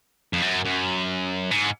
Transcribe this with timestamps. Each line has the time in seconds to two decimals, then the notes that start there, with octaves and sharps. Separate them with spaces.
0.33 F2
0.42 F#2
0.65 F#2
1.51 G#2